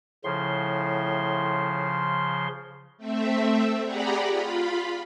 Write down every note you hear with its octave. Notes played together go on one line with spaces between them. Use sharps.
A2 C#3 F3 C6
A3 C4 E5
G4 G#4 D5 F#5 A#5 B5
F4 B5